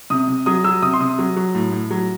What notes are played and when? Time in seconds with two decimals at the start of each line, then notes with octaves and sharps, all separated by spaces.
0.10 C3 D#6
0.28 C3
0.46 F#3 D#6
0.64 F#3 E6
0.82 C3 D#6
0.93 C6
1.00 C3 D#6
1.19 F#3
1.36 F#3
1.55 A2
1.72 A2
1.91 F#3